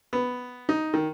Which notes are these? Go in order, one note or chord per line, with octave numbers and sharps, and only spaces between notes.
B3
D#4
D#3